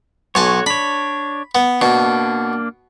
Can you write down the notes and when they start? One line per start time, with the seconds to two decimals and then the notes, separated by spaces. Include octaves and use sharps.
0.35 B1 F#4 C#5 G#5 A5
0.66 D4 C#5 B5
1.55 B3
1.81 B2 A#3 D4